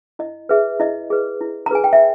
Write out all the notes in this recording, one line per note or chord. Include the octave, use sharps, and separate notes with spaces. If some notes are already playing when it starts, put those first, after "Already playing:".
E4 D#5
G#4 B4 E5
E4 D#5
G#4 B4
E4
A#5
G#4 B4 G#5
G5
E5